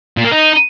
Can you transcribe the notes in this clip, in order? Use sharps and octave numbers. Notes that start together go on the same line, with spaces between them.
A#2
A#3
D#4